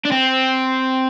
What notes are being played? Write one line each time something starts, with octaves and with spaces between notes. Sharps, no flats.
D4
C4